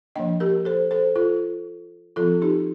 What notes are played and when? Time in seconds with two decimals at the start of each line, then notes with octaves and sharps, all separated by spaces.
0.16 F3 A#3 D4 D#5 G5
0.40 G4 A#4
0.65 A4 C5
0.91 A4 C5
1.16 F4 A4
2.16 F3 C4 F4 A4
2.42 D#4 G4